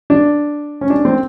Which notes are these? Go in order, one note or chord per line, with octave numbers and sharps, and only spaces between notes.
D4
C#4
D4
C4